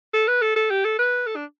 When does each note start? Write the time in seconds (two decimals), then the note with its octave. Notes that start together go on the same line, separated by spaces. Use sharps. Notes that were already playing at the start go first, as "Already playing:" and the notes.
0.13 A4
0.28 B4
0.42 A4
0.56 A4
0.70 G4
0.84 A4
0.99 B4
1.27 A4
1.36 D4